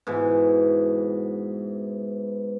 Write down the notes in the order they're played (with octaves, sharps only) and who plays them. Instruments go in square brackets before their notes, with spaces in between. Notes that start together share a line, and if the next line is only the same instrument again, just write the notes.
[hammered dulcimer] G#2 B2 E3